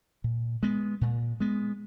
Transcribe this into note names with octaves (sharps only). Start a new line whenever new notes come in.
A#2
G#3 B3
A#2
G#3 B3